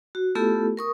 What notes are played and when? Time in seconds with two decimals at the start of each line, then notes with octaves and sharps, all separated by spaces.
0.15 F#4
0.35 A3 B3 E4 F4 G4 A4
0.77 A#4 C#6 D#6